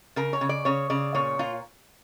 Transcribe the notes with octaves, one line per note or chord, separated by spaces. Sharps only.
C#3 A#4
C#5
C#3
D5
C#3 C#5
C#3 D5
A#2 C#5
A#2 F4